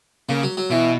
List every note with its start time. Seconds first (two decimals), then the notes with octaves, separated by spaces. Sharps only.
0.29 C#3 A#3
0.43 F#3
0.57 F#3
0.70 B2 E3